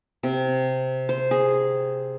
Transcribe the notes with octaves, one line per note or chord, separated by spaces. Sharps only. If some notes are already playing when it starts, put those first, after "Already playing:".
C3
C5
G#4